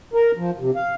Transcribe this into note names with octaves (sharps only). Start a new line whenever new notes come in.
A#4
F3
C3
F5